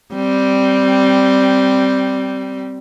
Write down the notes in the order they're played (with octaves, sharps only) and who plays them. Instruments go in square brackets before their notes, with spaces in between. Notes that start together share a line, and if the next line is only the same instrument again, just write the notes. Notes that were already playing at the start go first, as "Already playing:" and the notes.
[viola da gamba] G3 C4